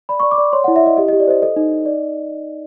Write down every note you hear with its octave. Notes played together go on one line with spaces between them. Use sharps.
D5 B5
C#6
D5
D6
D5
C#5 C6
F#5
E4
E5
E4 D#5
G4 D#5
D#5
G4
D5
C5 D#5
A4 D#5
D#4
D#4
D5